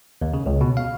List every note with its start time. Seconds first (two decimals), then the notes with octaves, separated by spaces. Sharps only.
0.22 D#2
0.34 C#3
0.46 C#2
0.61 B2
0.77 F5